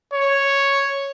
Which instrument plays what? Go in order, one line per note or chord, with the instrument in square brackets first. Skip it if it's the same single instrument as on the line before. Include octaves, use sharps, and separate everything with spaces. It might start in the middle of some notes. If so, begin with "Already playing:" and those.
[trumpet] C#5